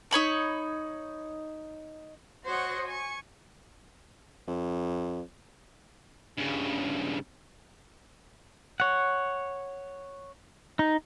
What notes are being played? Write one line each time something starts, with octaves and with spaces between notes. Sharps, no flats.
D#4 C#5 B5 C#6
F#4 C5 C#5 D#5 F#5 C#6
G#5 C#6
F2
G2 C#3
C#5 F#5
D#4